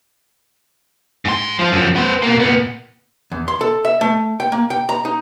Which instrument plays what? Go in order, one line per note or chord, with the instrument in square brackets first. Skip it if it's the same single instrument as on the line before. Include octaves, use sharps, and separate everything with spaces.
[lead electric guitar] G#2 C6
F3 F4
F#2 F3
B3 C5
B2 A#3
A#2 B3
[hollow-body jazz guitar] E2
C6
A4
E5
A3
G5
A#3
G5
A#5
D#4